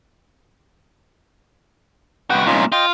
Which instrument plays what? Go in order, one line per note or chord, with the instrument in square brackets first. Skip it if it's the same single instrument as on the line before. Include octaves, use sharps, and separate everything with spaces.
[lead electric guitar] C2 F#4 [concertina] B3 G5
[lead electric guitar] C2 A#2 [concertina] C#4 D#4 F4
[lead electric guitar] F4 [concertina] D#5 G5